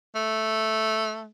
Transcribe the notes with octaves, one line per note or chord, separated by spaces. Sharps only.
A3